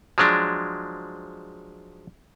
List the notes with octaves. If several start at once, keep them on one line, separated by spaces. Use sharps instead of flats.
F3 F#3 G#3 D4